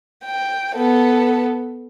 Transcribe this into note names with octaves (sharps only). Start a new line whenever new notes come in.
G5
B3 A4